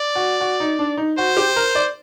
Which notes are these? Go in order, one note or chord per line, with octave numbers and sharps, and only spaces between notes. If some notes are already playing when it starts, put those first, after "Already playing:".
Already playing: D5
F#4
F#4
D#4
D4
D#4
F#4 C5
G4
A#4
D5